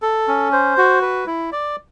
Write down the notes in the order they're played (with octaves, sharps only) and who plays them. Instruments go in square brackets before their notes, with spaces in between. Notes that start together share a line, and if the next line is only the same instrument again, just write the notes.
[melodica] A4
C#4
C5
F#4
B4
E4
D5